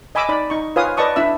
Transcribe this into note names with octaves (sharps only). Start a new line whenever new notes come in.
D#5 G#5 B5 D6 E6
D#4 D5 B5
D#4 C#6
F4 B4 C#5 F5 G#5 D#6
B4 D5 D#5 A5 C#6 D#6
D4 E4 E5 E6